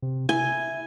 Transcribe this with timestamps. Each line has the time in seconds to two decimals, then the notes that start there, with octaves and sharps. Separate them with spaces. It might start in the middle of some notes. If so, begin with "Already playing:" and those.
0.02 C3
0.29 E4 G#5